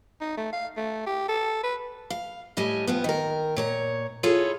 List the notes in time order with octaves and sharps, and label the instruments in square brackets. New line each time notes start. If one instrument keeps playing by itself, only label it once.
[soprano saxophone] D#4
A3
F5
A3
G4
A4
B4
[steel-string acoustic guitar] F5
A2 G3 D#5 G#5
G2 F3 B3
D#3 A#4
A#2 C#5 A#5
E4 F4 G#4 A4 C#5